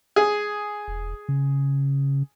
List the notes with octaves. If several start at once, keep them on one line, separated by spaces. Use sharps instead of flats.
G#4
E1
C#3